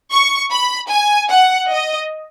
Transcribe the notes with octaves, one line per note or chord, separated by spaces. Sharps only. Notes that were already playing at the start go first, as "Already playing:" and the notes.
C#6
B5
G#5
F#5
D#5